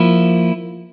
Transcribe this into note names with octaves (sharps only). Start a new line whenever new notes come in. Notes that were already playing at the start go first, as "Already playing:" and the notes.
Already playing: F3 A#3 E4